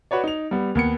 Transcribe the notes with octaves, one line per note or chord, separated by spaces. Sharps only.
F#4 B4 C#5 D5
D#4 F7
G3 B3
D#2 B3 C#7